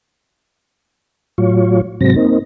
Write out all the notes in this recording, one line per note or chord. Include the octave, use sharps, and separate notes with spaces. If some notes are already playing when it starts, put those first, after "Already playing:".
A2 F#3 F4 C#5
G#2 C3 F#3 C4 A#6
A#3 C4 D#4